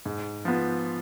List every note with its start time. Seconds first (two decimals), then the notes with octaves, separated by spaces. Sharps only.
0.06 G#2
0.45 F3 B3